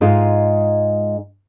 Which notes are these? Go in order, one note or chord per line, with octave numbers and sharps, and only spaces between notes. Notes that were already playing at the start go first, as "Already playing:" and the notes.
G#2 G#3 D#4 F4